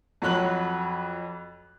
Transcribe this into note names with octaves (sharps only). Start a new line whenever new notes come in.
F2 F#3 C#5 B5 F#6 F#7